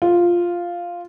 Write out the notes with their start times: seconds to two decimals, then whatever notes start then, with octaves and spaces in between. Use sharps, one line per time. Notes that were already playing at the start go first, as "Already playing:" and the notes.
0.02 F4